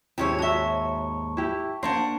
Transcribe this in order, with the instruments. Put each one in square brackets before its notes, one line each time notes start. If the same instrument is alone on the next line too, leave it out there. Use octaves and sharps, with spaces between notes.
[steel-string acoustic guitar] D#2 G#2 C#5 [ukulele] C#4 E4 G4
[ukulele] F#4 E5 [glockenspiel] A5 C#6
[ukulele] E4 G4
[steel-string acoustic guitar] A#3 D4 F#5 [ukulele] C5